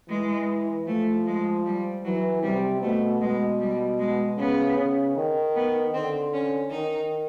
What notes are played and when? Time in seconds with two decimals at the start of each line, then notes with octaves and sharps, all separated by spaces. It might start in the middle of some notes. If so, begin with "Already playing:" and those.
0.09 E3 G#3
0.87 F3 A3
1.26 G#3
1.65 G3
2.04 E3 F#3
2.42 C3 G3
2.82 B2 A3
3.21 B2 G#3
3.60 G3
3.99 G#3
4.38 C#3 B3
4.77 C#3
5.16 D#3
5.55 B3
5.94 D3 C4
6.33 C#4
6.71 D#3 D#4